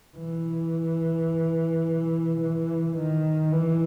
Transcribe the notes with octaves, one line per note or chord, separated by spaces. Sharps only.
E3
E3
D#3
E3